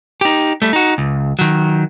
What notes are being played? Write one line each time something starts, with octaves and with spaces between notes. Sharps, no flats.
D#4 G4
G3 A3
D#4 F#4
C#2
D#3 F#3